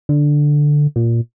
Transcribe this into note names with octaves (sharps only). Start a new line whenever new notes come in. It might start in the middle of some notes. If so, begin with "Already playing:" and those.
D3
A#2